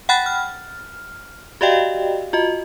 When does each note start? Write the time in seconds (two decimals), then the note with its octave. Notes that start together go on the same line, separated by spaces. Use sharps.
0.09 F#5 G5 B5 F#6 A6
0.26 F6
1.61 F#4 G4 D5 D#5 F5 G5
2.33 F4 F#4 D#5